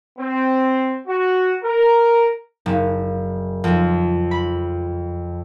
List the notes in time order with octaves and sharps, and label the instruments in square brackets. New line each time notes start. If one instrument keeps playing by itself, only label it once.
[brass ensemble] C4
F#4
A#4
[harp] F#1
F2
B5